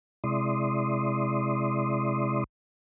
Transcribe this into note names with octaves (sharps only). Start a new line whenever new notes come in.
C3 G#3 E4 D5 C6 D#6